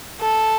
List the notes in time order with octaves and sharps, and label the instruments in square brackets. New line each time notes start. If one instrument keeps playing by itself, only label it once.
[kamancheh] A4